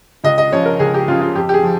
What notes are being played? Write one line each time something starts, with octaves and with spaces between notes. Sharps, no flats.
C#2 D#5
D#5
C#3 F3 C#5
A#4
C#2 G#4
G4
C#3 F3 F4
F4
F2 G4
G4
G#4
F3